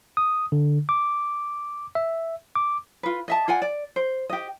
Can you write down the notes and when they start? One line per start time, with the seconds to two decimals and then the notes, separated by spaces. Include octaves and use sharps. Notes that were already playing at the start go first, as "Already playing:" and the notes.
0.17 D#6
0.52 D3
0.89 D6
1.95 E5
2.55 D6
3.03 F4 B4
3.28 D#5 E5 A5
3.48 F4 D5 F#5 G#5
3.62 D5
3.96 C5
4.30 G4 D#5